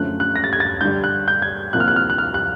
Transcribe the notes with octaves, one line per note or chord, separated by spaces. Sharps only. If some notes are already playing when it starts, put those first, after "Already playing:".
Already playing: F#2 D3 F3 A3 C#4 F#6
F#6
A#6
A6
G#6
A6
G2 D3 G3 G6
F#6
G6
G#6
C2 C3 F3 A#3 F#6
F6
F#6
F6
F#6
F6
F#6